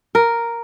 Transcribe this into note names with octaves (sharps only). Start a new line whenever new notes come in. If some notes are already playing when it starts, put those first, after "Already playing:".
A#4